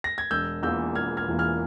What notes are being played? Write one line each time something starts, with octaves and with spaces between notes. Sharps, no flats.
A#6
G#6
E1 E6 G6
E2 E3 A#3 F4 E6 G6
E1 F6 G#6
F6 G#6
E2 E3 A#3 F4
F6 G#6